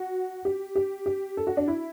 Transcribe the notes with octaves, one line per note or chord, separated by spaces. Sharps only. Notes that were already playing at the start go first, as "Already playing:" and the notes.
Already playing: F#4
G4
G4
G4
A4
F#4
D4
E4